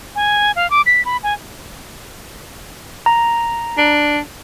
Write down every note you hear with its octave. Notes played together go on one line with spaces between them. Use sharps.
G#5
F5
D6
B6
B5
G#5
A#5
D4